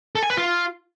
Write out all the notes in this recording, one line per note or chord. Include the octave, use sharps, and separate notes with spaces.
A4
G#5
B4
F4